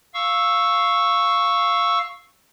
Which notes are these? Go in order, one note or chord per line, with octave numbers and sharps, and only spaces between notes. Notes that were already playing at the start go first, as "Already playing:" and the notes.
F5 C#6 E6